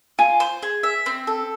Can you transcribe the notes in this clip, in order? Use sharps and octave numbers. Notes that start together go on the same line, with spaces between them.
F4 G#5
C5
G#4
E5
C4
A4